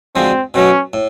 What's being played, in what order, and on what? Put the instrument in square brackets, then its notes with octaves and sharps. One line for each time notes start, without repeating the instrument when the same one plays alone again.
[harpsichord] D2 D3 F3 G#3 [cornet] C4
[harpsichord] B2 F#3 A3 [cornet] C#4
[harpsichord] A2